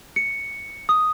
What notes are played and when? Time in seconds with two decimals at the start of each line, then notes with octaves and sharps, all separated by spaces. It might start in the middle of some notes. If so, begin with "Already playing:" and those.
0.16 C#7
0.89 D#6